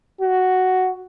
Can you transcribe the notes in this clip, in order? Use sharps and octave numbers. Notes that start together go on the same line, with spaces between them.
F#4